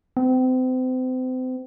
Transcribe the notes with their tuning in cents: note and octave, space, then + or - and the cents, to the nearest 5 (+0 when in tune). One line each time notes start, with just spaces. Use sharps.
C4 -35